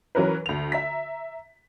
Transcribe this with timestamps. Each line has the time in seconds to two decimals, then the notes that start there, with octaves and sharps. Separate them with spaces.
0.15 E3 F#3 C#4 A#4 B4
0.46 D2 F7
0.72 E5 A#5 B6